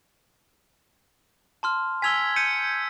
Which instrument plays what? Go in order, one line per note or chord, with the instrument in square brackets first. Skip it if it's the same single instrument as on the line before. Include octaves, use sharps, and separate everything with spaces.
[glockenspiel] A5 C6 F6
[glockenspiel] G#5 F7 G7 [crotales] E6 G#6 B6
[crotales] G6 C#7 [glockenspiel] D#7